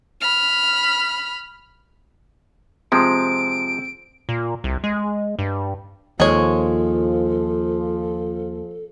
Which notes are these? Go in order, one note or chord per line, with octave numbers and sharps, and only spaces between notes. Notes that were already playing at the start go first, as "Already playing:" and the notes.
B5 F6
C3 F3 G#3 C4 D7
A#2
C2
G#3
G2
D#2 F3 G#3 A4 C#5